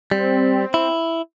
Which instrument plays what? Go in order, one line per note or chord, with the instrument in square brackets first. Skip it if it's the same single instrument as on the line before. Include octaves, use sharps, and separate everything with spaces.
[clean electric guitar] G3 [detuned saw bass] C4
[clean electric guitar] E4